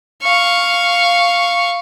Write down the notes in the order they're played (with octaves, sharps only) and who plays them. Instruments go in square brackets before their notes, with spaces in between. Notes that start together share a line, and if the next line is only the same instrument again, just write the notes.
[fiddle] F5 C#6